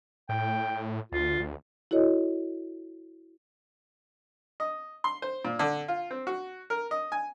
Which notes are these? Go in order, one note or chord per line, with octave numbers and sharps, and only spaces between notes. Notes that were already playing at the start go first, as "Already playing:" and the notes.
A2 G5
D2 F4
D2
E4 F#4 A4 C#5 D#5
D#5
C6
C5
A#2
D3
F4
C4
F#4
A#4
D#5
G#5